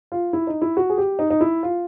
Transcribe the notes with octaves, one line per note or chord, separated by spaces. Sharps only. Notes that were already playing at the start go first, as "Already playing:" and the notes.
F4
E4
D#4
E4
F#4
G#4
G4
D#4
D#4
E4
F4